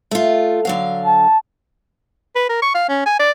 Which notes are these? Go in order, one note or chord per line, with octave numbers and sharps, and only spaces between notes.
A3 F4
D3 F#3 F5
A5
B4
A#4
C#6
F5
C#4
G#5
D5